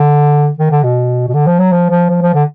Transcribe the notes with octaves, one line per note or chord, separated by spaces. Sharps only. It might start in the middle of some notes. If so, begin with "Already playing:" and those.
Already playing: D3
D#3
D3
B2
B2
D3
F3
F#3
F3
F3
F3
F3
D3